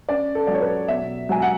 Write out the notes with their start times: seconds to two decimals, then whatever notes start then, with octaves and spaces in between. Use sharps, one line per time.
0.09 C#4 D5
0.35 A4
0.47 F#3 D5
0.54 C#5
0.61 B4
0.88 B2 E5
1.29 F#3 G#5
1.42 F#5